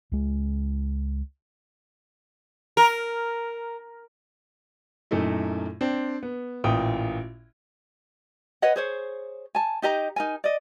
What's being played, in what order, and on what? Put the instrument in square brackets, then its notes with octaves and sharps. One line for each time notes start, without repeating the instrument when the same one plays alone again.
[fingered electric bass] C#2 G#3
[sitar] A#4
[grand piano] F#2 A#2 A3 D#4 E4
C4 D4
B3
A1 A#2 E4 F4 G5 D#6
[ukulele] B4 C#5 D#5 F#5
G#4 C5 C#5
G#5 A5
D#4 G4 D#5 A#5
D#4 A#4 G#5
D5 D#5